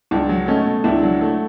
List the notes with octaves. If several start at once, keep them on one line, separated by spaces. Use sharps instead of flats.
C#2 D4
F#3
A3 C#4 D#4
B2
C#2 D4 E4
F#3
A3